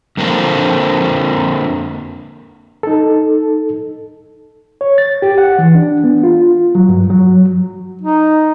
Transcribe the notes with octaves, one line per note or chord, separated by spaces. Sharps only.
F2 D3 A#3 C4 A4
D#4 A4
C#5
A6
G4
F#5
E3
D4
B3
F4
F#3
G2
F#3
D#4